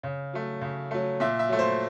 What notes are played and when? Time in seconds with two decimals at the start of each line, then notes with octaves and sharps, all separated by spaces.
0.03 C#3
0.33 F#3 A3
0.61 C#3
0.91 F#3 A3
1.20 A#2 E5
1.39 E5
1.49 F#3 A3
1.59 C5